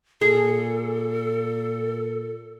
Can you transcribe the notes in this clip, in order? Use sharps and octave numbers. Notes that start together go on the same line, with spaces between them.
A#2 G#4 A4